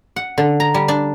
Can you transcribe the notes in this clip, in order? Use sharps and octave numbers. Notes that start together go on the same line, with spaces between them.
F#5
D3
A#5
G3
D4